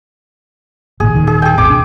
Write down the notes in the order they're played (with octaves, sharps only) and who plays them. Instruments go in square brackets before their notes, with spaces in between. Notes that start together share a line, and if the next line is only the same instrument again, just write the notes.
[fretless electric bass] G#1 A#2 D#3 [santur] G#4
[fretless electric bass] D#1 D#3
[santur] G#4
G#4 G5
[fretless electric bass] D#1 G#1 C4 [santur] D6
[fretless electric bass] B2 D4